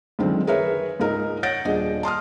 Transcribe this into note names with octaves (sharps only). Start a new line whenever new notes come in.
C#2 F#2 D3 D#3 C4
G#4 A#4 B4 C#5 E5
C#2 G#2 D#4 A#4
C#5 F#5 G6 A6 A#6 D7
D#1 D4 G#4 D#5
A5 C6 D#6 F6